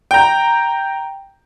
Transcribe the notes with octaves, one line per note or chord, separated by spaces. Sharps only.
G5 A#5